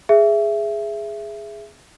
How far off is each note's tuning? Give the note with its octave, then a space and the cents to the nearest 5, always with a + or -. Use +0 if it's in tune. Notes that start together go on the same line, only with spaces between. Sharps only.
G#4 +0 E5 +15